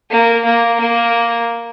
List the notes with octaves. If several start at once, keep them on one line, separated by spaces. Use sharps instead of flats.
A#3
A#3
A#3